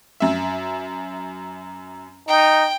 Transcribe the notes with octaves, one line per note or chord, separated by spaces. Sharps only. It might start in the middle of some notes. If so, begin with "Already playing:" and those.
F#2 E5
D#4 G5